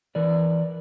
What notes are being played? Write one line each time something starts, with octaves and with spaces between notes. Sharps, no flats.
E3 A#4 B4 D5